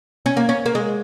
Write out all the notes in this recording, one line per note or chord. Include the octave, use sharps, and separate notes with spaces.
C#4
A#3
C#4
A#3
G#3